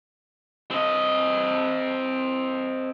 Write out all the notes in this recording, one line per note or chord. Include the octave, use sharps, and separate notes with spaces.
C4 D#5